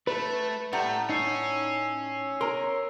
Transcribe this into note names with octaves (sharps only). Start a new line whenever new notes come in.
A3 B4
A2 G3 A3 F#5 A#5
C#4 D#4 E6 C7
A#4 G#5 A#5 C6